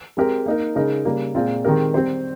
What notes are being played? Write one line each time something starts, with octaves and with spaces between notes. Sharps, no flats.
G#3 C4 G4 A#4
A#3 D#4 A#4
C#3 G#3 D#4 A#4
C#3 G3 A#3
A#2 G#3 C4 F4
D#3 G#3 C4 G4 A#4
G3 C4 G4 C5